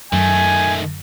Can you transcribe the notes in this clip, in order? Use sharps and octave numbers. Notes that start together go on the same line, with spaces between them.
F#2 D#3 A3 G#5